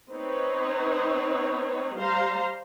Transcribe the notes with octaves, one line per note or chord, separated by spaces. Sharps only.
C4 D#4 B4 C#5
G3 C5 F5 A#5 C6